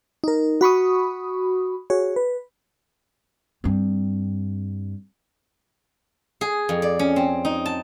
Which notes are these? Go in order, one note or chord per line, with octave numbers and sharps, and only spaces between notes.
D#4 A#4
F#4 B5 C#6 D#6
F#4 G#4 C#5
B4
G2 C4
G#4
F2
D5
C#4
C4
D#4
A5